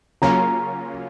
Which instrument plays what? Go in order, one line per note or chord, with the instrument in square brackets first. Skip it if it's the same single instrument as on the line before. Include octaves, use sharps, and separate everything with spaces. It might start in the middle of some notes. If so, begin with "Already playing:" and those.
[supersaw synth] C#3 F#3 A#3 C#4 F4 [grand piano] A#5